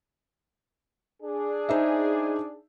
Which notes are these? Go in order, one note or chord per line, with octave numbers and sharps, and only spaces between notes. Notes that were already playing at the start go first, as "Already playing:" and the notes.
D4 G#4
D#4 C5 E5